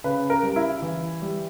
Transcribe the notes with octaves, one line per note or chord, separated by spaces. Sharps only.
C#3 B4
A#4
G3
E4
E3
G3